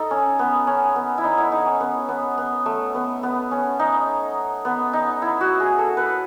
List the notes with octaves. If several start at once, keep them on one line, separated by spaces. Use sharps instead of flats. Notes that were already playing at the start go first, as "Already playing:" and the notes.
Already playing: D#4 A4
C#4
B3
C#4
B3
E4
D#4
E4
D#4
C#4
B3
B3
B3
A3
B3
B3
C#4
D#4
B3
D#4
E4
F#4
G#4
A4
B4